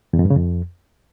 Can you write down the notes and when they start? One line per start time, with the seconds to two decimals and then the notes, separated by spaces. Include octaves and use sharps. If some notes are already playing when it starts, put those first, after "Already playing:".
0.13 E2
0.19 F2
0.25 G2
0.30 C#3
0.36 F2